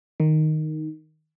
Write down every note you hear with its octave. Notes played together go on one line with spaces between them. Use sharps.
D#3